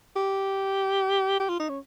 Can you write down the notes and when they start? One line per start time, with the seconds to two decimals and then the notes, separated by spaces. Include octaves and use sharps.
0.16 G4
1.40 G4
1.49 F4
1.59 D#4
1.69 C#4